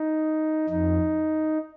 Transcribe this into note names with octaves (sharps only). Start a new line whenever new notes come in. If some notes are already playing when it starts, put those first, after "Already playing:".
Already playing: D#4
F2 D#4